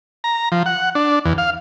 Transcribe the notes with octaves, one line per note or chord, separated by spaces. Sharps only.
A#5
F3
F#5
D4
E2
F5